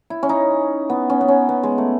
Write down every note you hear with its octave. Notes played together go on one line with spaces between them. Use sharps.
E4
C#4
D#4
B3
C#4
B3
C#4
B3
G#3
A3